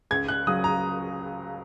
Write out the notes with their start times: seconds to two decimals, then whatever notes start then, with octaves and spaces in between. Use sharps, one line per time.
0.11 C#2 G#6
0.28 F#6
0.47 C#3 F#3 D#6
0.64 A#5